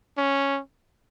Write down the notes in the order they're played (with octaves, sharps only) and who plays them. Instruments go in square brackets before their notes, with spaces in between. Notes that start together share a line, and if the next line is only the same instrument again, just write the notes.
[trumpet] C#4